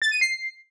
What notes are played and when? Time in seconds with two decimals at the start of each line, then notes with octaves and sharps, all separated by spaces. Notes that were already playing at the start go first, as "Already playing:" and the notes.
0.02 A6
0.11 D#7
0.21 C7